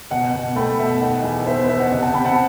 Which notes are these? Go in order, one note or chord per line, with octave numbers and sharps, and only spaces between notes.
B2 D#5 F#5
B2
A3 G5 B5
B2 E5 G5
D#3 D#5 F#5
E2
B3 C5 E5
C5
B3 C5 E5
D#5 F#5
C3 D#5 F#5
F#5 A5
C3 G5 B5
F#5 A5